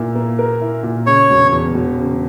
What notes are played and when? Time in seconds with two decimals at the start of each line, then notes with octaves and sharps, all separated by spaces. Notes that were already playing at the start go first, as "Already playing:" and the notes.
Already playing: A#2 E4
0.15 A#3
0.39 A#4
0.62 E4
0.83 A#2
1.06 C#3 C#5
1.30 E1
1.52 E2
1.74 E1
1.98 C#3